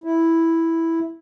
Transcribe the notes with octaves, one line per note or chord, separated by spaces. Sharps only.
E4